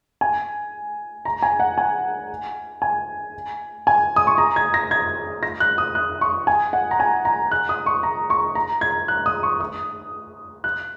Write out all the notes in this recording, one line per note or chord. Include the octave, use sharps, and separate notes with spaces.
G#5
A#5
G#5
F#5
G#5
G#5
G#5
D#6
C#6
A#5
G#6
A#6
G#6
A#6
F#6
D#6
F#6
C#6
G#5
F#5
A#5
G#5
A#5
F#6
D#6
C#6
A#5
C#6
A#5
G#6
F#6
D#6
C#6
D#6
F#6